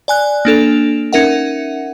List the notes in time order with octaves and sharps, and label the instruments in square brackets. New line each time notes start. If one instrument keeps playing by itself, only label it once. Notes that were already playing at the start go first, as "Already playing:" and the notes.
[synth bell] D5 G#5 F#6
A#3 D4 A4 F7
C#4 D#4 A#4 E5 F#5